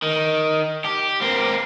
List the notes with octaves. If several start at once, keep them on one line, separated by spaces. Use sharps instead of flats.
D#3
G4
A#3 C4